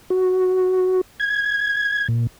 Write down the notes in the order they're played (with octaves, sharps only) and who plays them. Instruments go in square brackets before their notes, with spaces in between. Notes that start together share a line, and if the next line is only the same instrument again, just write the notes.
[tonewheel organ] F#4
G#6
A#2